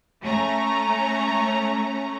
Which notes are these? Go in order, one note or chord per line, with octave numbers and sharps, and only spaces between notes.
A3 C#4 A#5